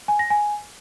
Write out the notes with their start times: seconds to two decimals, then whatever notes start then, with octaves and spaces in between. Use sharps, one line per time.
0.08 G#5
0.19 A#6
0.30 G#5